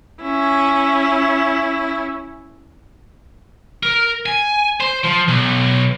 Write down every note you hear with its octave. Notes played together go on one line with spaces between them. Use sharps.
C#4 E4
A#4
G#5
C5
F3
B1